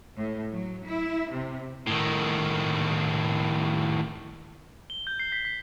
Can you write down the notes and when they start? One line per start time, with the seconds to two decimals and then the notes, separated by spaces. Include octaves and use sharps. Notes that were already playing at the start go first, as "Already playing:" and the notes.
0.17 A2
0.52 F#3
0.87 E4
1.30 C3
1.87 A2 D#3
4.90 G7
5.07 G6
5.20 C7
5.32 B6
5.45 B6